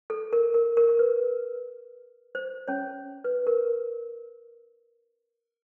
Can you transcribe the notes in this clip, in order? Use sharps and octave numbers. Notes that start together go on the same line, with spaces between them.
A4
A#4
A#4
A#4
A#4
B4
C5
C#4 C#5
B4
A#4